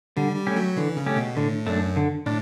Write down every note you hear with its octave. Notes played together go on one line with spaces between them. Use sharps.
D3 G3
G3
A3 C#4 G4
F#3
D3 E3
C#3
A3 C#4 G4
B2
A2 D3
F#2 A3 D4
D3
A2 D4